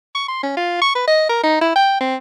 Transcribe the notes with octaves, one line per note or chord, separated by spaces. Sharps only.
C#6
C6
C#4
F4
C#6
B4
D#5
A#4
D#4
E4
G5
C4